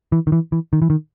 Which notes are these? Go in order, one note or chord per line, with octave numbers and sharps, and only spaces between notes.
E3
D#3
E3
E3
D#3
E3
D#3